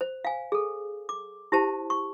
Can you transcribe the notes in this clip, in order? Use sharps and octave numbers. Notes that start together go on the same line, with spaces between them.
C5
F5 G#5
G#4 A4
D6
E4 G4 C5 A5
C#6